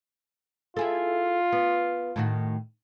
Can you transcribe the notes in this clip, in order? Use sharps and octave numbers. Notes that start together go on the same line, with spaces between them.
E4 F4 G#4 A4
B3
A2 D#3 F#4